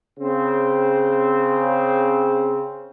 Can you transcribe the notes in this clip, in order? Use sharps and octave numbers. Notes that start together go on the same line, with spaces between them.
C#3 C4